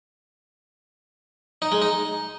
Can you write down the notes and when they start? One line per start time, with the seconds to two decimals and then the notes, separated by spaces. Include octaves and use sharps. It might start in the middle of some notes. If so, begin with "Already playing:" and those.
1.62 D#4
1.72 G#3
1.82 D#4